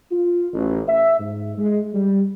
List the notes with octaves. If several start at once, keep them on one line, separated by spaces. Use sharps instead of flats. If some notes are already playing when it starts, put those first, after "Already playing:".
F4
A1
E5
G#2
G#3
G3